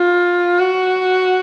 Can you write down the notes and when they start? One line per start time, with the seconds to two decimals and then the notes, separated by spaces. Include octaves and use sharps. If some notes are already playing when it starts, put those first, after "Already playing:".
Already playing: F4
0.59 F#4